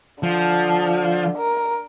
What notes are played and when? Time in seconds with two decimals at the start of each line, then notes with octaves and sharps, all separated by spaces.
0.23 D3 F3
1.37 A#4